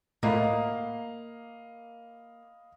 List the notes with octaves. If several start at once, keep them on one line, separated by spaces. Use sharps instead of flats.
A2 A3 A#3 F4 D#5 F5 F#5 B5